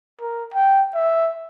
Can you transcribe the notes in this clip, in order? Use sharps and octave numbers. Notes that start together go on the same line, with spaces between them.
A#4
G5
E5